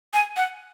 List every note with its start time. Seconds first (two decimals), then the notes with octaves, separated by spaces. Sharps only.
0.14 G#5
0.36 F#5